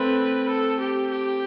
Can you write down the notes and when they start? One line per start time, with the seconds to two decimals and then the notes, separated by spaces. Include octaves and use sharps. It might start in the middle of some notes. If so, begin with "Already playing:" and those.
Already playing: A3 C4 B4
0.49 A4
0.80 G4
1.11 G4